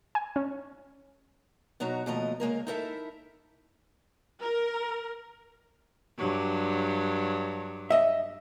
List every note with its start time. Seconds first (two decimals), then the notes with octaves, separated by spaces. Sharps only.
0.15 G#5
0.36 C#4
1.80 B2 F#3 D#4 F#4 A#5
2.06 D#2 B2 F3 A3 D#5 A#5
2.40 C#3 G#3 A#3 A#4
2.67 D#4 E4 A4 A#4 C5 E5
4.42 A#4
6.17 G2 F#3
7.90 D#5 E5